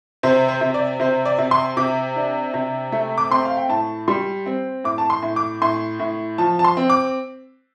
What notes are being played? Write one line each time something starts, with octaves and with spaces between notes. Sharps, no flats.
C3 C5
C5
C3
D5
C3 C5
D5
C3
C6
C3 D6
D4
C3
A3
D6
C4 C6
F5
G5
A2 A5
G3 C6
C4
A2 D6
A5
C6
A2
D6
A2 C6
A2
F3 A5
A5
C6
C4
D6